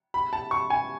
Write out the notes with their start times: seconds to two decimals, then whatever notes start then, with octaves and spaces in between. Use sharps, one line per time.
0.14 B5
0.33 A5
0.51 C#6
0.70 G#5